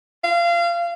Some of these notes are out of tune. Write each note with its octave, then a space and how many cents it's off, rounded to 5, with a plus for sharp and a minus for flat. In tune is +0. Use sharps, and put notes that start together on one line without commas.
F5 -25